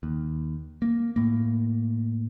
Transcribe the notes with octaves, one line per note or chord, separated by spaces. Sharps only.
D#2
A#3
A2 A#3